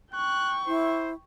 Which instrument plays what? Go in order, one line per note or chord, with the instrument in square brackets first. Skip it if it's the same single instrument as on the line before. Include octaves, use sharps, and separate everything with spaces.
[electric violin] G5 C#6 [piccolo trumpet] F#6
[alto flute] E4 [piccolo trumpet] C5